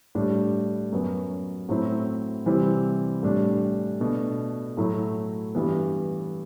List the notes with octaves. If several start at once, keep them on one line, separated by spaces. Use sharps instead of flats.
A2 G3 D4
F#2 F#3 B3
A2 F#3 C4 E4
C3 E3 G3 C4 E4
A2 G3 D4
B2 A3 D4
A2 F#3 A3 E4
G2 E3 G3 B3